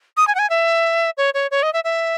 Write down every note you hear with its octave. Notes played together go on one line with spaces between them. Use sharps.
D#6
G#5
F#5
G#5
E5
C#5
C#5
C#5
D#5
E5
E5